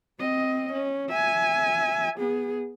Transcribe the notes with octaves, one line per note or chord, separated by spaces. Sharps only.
C4 D#5
C#4
E5 G#5
B3 G#4